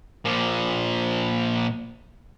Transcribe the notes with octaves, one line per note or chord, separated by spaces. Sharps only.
A#2 F3